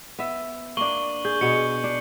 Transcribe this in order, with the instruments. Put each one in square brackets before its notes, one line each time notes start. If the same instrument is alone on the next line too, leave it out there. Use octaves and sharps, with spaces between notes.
[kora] B3 E5
[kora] A#3 D4 [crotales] C#6 F#7 G7
[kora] G#4 [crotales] G6
[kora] B2 B3 G#4 [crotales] C#7
[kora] D4